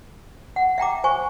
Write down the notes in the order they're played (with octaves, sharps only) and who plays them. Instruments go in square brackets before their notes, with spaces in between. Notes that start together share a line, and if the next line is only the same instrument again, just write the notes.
[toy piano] F#5
E5 G5 A#5 D6
C5 G#5 C#6